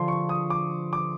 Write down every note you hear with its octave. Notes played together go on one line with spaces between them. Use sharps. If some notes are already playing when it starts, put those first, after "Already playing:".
Already playing: D3 F3 C6
C#6
D#6
D6
D6